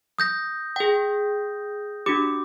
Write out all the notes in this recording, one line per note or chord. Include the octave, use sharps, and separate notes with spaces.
D#6 G6 A#6
G#4 G5
D4 F#4 G4 D6